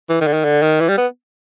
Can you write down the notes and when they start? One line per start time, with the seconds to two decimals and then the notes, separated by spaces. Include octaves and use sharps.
0.09 E3
0.21 D#3
0.27 D3
0.33 D#3
0.45 D3
0.62 D#3
0.80 E3
0.89 G3
0.98 B3